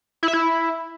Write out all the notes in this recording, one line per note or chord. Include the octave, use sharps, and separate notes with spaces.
E4
E5
E4